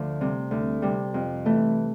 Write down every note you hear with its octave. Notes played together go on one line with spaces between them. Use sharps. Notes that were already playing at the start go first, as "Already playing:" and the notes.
Already playing: D2 D3 F3 A3
C3 G3
D2
C3 G3
F2
E3 A3